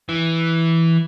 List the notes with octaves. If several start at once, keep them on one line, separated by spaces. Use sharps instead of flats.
E3